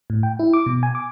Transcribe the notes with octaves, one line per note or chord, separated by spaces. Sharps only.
A2
G5
E4
D6
B2
G#5
D6